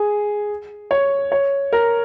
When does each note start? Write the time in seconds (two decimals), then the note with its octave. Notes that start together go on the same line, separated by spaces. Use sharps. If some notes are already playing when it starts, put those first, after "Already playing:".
Already playing: G#4
0.91 C#5
1.32 C#5
1.73 A#4